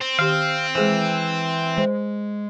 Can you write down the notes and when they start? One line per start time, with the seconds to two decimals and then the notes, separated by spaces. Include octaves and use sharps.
0.01 C4
0.19 D#3 G4 F5
0.75 E3 G#3 G#4 C5
1.78 G#3 C5